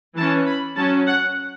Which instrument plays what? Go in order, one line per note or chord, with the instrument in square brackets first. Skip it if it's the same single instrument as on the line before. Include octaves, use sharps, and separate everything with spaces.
[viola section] E3 C#4 A5
B5
F#3 C#4 A5
F#5